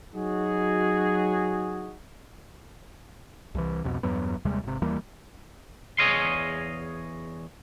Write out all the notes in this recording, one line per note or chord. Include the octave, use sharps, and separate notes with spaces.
F#3 D#4 F#4 G#4
C2 E3
C2 F2 B2
E2 G2 F#3 B3
D#2 C3 G3 G#3
G#1 C3
D#2 E3 G3 A#3
E2 G#4 C#5 D#5 F5 C6